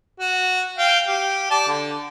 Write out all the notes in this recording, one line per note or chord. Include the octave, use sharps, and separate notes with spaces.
F#4
F5 G5
G4
D5 A5
D3